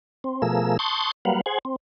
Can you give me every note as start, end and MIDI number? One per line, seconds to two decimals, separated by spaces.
0.24 0.42 60
0.42 0.77 47
0.42 0.77 53
0.42 0.77 57
0.42 0.77 68
0.42 0.77 70
0.42 0.77 88
0.79 1.11 81
0.79 1.11 84
0.79 1.11 85
0.79 1.11 87
0.79 1.11 90
0.79 1.11 91
1.25 1.41 54
1.25 1.41 55
1.25 1.41 58
1.25 1.41 71
1.25 1.41 77
1.25 1.41 78
1.46 1.59 68
1.46 1.59 72
1.46 1.59 78
1.46 1.59 80
1.65 1.76 60